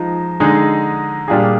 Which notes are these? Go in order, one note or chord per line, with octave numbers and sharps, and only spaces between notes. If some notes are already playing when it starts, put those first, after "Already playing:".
Already playing: F3 G#3 D#4
D3 G#3 D#4 G#4
A#2 G3 D4 F4 G#4